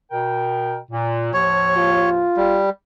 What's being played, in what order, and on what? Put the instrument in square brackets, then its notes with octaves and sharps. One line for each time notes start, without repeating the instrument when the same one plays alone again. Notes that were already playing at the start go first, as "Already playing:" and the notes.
[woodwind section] B2 A#4 G5
A#2
[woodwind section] D#2 A2 F3 [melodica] C#5
[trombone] F4
[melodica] G3